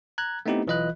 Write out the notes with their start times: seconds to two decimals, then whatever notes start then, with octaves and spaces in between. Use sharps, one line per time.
0.18 A#5 F#6 G#6
0.46 A3 B3 C4 D#4 E4 G4
0.67 B1 E3 F4 D#5 B5 F#6